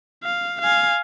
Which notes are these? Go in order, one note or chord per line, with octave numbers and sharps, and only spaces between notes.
F5
F5 G#5